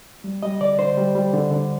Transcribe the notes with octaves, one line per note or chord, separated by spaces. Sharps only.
G3
G3 D#5
D3 D5
D3 C5
G3
G3
D3
D3